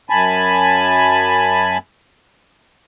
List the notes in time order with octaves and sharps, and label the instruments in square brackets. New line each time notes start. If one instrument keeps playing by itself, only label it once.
[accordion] F#2 G#5 A5 B5